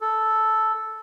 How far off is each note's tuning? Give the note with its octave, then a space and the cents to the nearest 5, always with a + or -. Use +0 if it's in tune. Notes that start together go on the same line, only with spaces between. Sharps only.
A4 -5